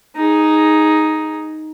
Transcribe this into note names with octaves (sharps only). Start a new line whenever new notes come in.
D#4 G#4